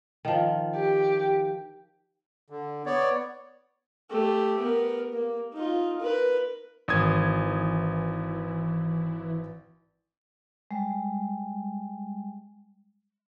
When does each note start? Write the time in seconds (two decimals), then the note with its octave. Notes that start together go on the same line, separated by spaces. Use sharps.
0.25 D#3 F3
0.75 G4
2.50 D3
2.86 B3 C#5 D5
4.10 A3 G4
4.60 B3 A#4
5.13 A#3
5.54 D#4 F4
6.00 A#4 B4
6.88 G#1 E3 D#6 G#6
10.71 G3 G#3